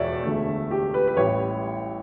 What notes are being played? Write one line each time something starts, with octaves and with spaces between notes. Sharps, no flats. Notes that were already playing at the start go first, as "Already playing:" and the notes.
Already playing: E1 E2 B2 C#5 D5 E5
E1 D2 D3 A3
G4
B4
B4
A1 A2 G3 C#5